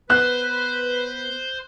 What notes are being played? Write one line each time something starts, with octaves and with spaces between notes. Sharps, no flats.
B3 B4 C5 F#6